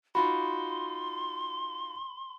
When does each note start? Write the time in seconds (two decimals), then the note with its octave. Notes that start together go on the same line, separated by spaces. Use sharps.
0.15 D#4 F4 F#4 B5 C6